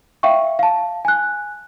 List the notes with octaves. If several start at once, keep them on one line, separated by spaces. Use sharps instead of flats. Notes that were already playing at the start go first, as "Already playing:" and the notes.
E5 F5 G5 C#6
F5 A5
G#5 F#6